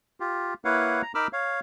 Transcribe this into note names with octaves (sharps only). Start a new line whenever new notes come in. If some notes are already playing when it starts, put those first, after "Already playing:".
F4 G4
A#3 E4 B4 C#5 F5 F#5
A#5
D#4 A#4 B5 D6 E6 F6
C#5 F5